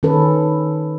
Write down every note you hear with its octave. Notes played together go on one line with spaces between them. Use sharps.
D#3 C#4 A4 B4